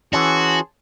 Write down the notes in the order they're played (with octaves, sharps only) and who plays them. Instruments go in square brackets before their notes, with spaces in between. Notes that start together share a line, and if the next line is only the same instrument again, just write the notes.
[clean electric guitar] E3 C#4 [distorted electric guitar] F#4 [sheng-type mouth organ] G#4 A5 C6